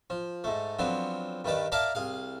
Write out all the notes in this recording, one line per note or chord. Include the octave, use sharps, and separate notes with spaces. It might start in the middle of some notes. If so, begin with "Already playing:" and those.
F3
G#2 A3
D3 F3 F#3 B3 C4
G2 D#3 B4 D5
A#4 D5 E5 F5 A5 A#5
C2 G#4 F5